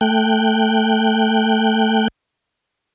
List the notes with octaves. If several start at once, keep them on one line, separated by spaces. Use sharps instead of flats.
A3 G5 F#6